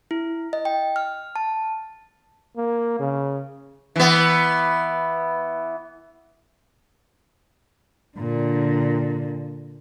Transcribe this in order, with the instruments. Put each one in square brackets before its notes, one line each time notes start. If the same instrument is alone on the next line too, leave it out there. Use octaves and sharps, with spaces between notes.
[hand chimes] E4
D#5
G5
F6
A5
[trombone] A#3
C#3
[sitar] E3 B3
[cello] A#2 D3